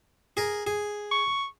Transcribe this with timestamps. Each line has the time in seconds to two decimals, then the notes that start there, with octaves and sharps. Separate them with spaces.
0.37 G#4 A#4
0.67 G#4
1.12 C#6